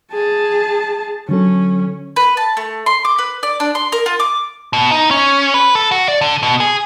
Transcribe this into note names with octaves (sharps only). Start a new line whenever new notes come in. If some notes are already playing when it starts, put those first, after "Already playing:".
G#4 A5
D3 F#3 C#4 A4
B4
A5
A3
C6
D6
B4
D5
D4
C6
A#4
F4
D6
B2
D#4
C#4
B4
A4
F#4
D5
D3
B2
G#4